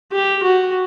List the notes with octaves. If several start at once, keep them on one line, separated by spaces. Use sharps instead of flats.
G4
F#4